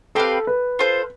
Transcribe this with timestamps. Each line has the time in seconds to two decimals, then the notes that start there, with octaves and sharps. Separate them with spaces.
0.15 C4 G4 A4 B4 F5
0.47 B4
0.79 F4 A4 C5